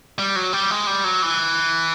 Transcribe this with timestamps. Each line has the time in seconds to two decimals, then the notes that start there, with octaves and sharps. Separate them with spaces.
0.18 G3
0.36 F#3
0.53 G3
0.71 G#3
0.87 G3
1.04 F#3
1.22 E3